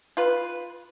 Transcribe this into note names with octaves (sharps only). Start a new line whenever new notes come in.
F4 B4